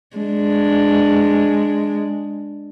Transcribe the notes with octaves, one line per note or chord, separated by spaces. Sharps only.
G#3 D4